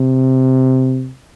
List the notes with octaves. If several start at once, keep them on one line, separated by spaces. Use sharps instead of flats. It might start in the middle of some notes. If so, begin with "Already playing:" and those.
Already playing: C3